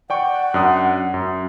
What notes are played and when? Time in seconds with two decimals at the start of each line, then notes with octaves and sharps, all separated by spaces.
0.10 D5 F#5 G5 C#6
0.54 F#2 D4 D#6
1.14 F#2